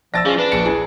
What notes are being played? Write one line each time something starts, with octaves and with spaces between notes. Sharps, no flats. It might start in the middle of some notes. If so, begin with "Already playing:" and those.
F3 D5 E5 A5 E6 A6 A#6
F3 C#4 G#4
D4 B4
A#1 C#7
E4 G#4